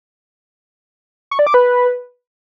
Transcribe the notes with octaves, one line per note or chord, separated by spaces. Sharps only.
C#6
D5
D6
B4